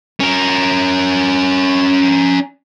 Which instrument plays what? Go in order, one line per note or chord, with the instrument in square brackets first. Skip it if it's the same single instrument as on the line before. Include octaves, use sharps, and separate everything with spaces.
[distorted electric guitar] C#4 A#4